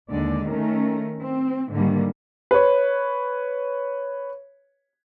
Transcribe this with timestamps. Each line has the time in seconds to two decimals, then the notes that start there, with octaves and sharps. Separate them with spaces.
0.10 D#2 D3 G#3 D5
0.50 D#3 A3 C#4 A#4
1.21 C4
1.72 G#2 D3 D#3 G3 A#3
2.51 B4 C#5